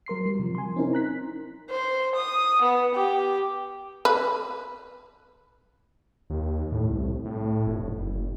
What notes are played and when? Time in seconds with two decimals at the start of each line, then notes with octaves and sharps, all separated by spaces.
0.06 F#3 A#4 C6 C7
0.26 G3
0.39 C3 F3
0.55 G#5 C6
0.76 C4 C#4 D#4 E4 A#4
0.93 A#5 F#6 B6
1.70 C5
2.15 D#6
2.61 B3
2.95 G4
4.05 B4
6.30 D#2
6.72 A2
6.90 C2
7.25 A2
7.67 F1
7.88 F#1